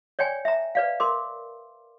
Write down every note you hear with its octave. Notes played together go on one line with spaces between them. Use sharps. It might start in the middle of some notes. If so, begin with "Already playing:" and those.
C#5 D5 G5 G#5
E5 A#5
B4 D5 F5
A#4 C6 D6